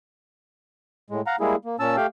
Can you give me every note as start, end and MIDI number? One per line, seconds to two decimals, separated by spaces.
1.10 1.21 45
1.10 1.21 56
1.27 1.36 77
1.27 1.36 78
1.27 1.36 82
1.40 1.56 55
1.40 1.56 56
1.40 1.56 58
1.40 1.56 64
1.40 1.56 68
1.65 1.76 58
1.80 1.96 46
1.80 1.96 61
1.80 1.96 81
1.80 1.96 88
1.97 2.07 57
1.97 2.07 67
1.97 2.07 77
1.97 2.07 79